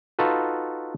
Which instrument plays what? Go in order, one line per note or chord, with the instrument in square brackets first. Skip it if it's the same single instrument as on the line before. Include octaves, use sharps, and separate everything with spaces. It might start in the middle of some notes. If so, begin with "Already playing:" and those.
[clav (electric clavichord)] D#4 F4 F#4 A4 B4